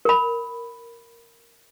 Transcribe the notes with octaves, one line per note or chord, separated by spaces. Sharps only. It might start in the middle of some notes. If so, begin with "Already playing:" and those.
A#4 B5